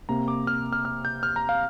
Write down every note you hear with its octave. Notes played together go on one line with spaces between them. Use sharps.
C3 A#3 A#5
D6
F6
F6
F6
G6
F6
A#5
F5